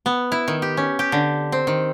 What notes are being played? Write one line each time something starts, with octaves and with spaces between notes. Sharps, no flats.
B3
E4
D#3
G4
C#4
G4
D3
C4
D#3